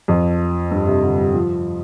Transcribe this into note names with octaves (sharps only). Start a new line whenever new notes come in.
F2
G2
C3
D3
G3
F3